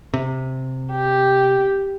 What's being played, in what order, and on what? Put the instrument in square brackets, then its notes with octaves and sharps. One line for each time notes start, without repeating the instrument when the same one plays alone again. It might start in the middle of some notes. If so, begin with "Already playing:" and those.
[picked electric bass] C3
[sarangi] G4